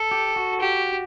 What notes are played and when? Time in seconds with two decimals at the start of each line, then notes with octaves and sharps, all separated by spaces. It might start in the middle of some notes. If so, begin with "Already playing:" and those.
Already playing: A4
0.11 G4
0.36 F#4
0.60 G4